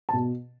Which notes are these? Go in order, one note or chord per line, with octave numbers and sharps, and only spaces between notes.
A5
B2